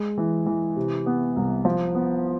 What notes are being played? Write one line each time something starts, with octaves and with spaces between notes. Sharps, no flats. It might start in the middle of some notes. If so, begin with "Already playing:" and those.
Already playing: G#3
E3
E3
C3
B3
C2
F3
B3